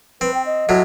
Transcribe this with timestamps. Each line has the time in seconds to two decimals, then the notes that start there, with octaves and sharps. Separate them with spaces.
0.21 C4 B4
0.34 G5
0.46 D#5
0.69 A2 F#3